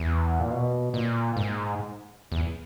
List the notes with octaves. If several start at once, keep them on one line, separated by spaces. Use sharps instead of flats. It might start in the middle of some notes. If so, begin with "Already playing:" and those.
Already playing: E2
A#2
B2
A#2
G#2
E2